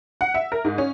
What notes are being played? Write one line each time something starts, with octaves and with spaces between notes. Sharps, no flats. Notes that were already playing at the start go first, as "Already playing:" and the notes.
F#5
E5
A#4
G#2
C#4